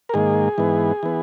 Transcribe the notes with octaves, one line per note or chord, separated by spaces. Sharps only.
A#4
G#2 D#3 A#3 G#4
G#2 E3 B3
E3 B3